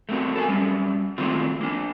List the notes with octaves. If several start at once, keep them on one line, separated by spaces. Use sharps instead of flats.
A3 A#3 C4 F#4
A4 A#4 F#5 G#5
F#3 G3 C#4
D#3 F#3 G#3 A3 C4 F4
A#3 D4